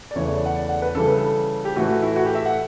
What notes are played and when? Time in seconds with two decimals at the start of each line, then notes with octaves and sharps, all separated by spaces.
0.11 D5
0.15 E2 C#3 E3 A3 C#5
0.26 C#5
0.36 D5
0.46 F#5
0.56 D5
0.69 F#5
0.82 B4
0.95 C#3 E3 G3 A4
1.08 B4
1.18 A4
1.65 G4
1.76 A2 E3 A3 F#4
1.88 F#4
2.02 E4
2.16 F#4
2.26 G4
2.35 E5
2.46 F#5